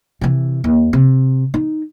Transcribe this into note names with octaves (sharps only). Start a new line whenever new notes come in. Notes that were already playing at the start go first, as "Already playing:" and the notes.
C3 E3
D#2
C3
D#4